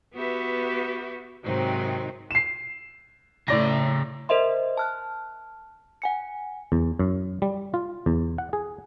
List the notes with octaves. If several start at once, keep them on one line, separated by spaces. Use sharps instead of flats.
B3 F#4 G4 B4 E5
G#2 C3 D#3 F#3 C4 D#4
C7 E7
A2 C#3 D5 A#5 A#6
A#4 C5 D#5 E5 C6
A5 F6 F#6
F#5 G#5 C#7
E2
F#2
G3
F4
E2
F#5
G#4